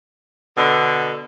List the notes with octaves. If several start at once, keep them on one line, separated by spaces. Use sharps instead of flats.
B2 D3